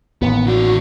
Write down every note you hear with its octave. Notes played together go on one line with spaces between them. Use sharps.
A1 D#2 B3
D#3 F#4 D5